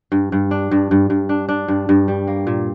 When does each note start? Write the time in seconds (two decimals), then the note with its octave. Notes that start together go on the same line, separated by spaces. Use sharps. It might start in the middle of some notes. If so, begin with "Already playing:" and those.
0.12 G2
0.32 G2
0.51 D4
0.71 G2
0.91 G2
1.10 G2
1.29 D4
1.49 D4
1.68 G2
1.89 G2
2.08 G3
2.27 A#3
2.47 A#2